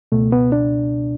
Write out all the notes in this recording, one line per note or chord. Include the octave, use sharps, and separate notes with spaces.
C#2 B2 A3
B3
D4